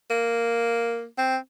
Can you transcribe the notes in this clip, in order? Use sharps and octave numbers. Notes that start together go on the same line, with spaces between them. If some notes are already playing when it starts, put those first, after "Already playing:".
A#3
C4